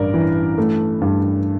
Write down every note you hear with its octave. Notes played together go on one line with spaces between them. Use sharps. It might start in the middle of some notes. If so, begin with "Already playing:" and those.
Already playing: A1 G2 A#4 D5
E3
A3
G2